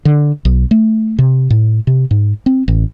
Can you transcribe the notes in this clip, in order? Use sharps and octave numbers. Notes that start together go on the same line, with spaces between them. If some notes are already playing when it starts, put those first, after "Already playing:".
D3
B1
A3
C3
A2
C3
G#2
C4
A1